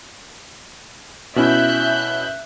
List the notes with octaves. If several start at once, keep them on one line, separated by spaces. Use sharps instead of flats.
B2 C#4 E4 E5 F#6 G6